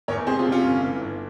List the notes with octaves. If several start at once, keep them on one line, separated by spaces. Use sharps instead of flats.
E2 A#4 C#5
C3 G#4 C5
F4 G#4
C3
C#4 F4
G1
E3
G1